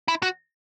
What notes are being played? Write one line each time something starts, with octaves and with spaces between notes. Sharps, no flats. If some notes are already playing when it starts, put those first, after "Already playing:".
E4
F#4